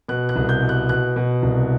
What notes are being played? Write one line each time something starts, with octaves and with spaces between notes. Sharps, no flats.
B2 F#6
F#6
C2
G6
B2
F#6
B2 F#6
B2
C2